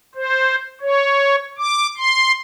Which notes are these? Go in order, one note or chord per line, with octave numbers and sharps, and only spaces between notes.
C5
C#5
D6
C6